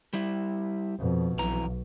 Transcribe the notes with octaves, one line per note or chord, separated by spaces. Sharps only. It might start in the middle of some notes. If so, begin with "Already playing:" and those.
G3 E4
F2 B2
B1 F2 E3 A#5